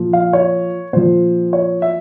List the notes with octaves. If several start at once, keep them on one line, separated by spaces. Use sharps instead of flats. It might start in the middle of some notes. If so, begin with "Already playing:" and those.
Already playing: A#2 F3
F5
C#5
A#2 F3 C5
C#5
E5